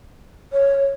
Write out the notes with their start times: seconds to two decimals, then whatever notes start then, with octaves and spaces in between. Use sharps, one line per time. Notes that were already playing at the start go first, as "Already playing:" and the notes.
0.52 C#5